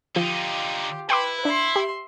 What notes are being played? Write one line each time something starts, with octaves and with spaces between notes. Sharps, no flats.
D3 F3 D#4 F4 G4
E4 B4 G5 C6 D6
D4 E5 C6
G4